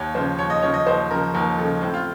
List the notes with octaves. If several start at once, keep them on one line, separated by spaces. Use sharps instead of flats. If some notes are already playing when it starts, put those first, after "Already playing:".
Already playing: D#2 C#5
C#3 F3 C5
D#2 C#5
D#5
C#3 F3 C#5
D#5
D#2 C5
C#3 F3 A#4
D#2 A#4
C#3 F3 A4
A2 C4
F4